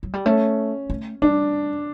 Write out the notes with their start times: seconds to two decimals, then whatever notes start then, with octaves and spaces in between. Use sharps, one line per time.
0.03 F#3
0.14 G3
0.26 A3 C#4
0.90 A3
1.22 G3 D4